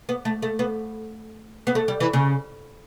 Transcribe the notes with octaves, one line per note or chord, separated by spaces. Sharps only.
B3
A3
A3
B3
B3
A3
G3
E3
C#3